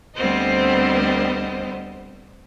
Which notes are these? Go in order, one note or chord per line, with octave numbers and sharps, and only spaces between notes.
D2 G3 B3 C4 C5 D#5